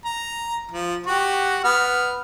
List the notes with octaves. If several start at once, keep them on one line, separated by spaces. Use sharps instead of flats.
A#5
F3
F#4 G4 F#5
B3 F6